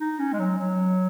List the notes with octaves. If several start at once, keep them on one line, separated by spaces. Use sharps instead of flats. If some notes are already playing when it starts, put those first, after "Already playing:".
D#4
C#4
G#3
F#3
F#3